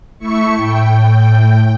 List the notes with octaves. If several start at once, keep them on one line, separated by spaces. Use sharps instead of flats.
A3 E4 E5 C#6 C#7
A2 G5